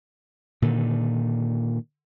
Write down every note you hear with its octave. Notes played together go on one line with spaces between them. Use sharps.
A#2 D3 D#3